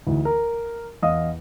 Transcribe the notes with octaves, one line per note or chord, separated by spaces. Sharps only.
D2 E3 D#4
A#4
E2 D#5 F5 D#6